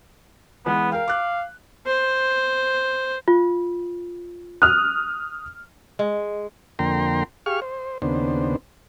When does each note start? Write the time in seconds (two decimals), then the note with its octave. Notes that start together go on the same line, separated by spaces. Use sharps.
0.66 E3 G#3 B3
0.92 A#4 F5 G5
1.08 D6 F#6
1.87 C5
3.28 F4
4.62 D#6 F6 F#6
5.99 G#3
6.79 F2 D3 A#3 G5 A#5 C6
7.46 G4 G#4 F5 C#6 F6
7.62 C5
8.02 D#2 C#3 B3 D4 C5